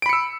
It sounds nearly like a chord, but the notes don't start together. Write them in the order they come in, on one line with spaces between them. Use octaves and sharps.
D7 B5 C#7 E6